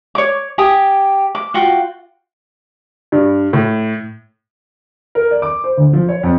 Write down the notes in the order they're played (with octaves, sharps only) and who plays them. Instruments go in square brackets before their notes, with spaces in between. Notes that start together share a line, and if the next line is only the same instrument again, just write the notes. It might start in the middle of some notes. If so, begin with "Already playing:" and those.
[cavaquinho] C#5 D6
G4 G#5 D#6
D6
F4 F#4 G5
[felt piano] G2
A2
[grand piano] A#4
D5
D6
C5
D2
F3
C#5
F2